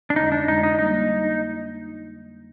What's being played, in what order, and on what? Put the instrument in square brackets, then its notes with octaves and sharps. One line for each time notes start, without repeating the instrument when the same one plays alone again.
[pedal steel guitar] D4
[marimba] F2 D3 G#3 [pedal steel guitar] D#4
[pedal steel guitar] D4
[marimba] F2 D3 G#3 [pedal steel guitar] D#4
[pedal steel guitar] D#4
[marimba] G3 A#3 D4 [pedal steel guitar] D#4
[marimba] G3 A#3 D4